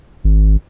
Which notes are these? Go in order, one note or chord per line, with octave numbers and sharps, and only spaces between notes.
G#1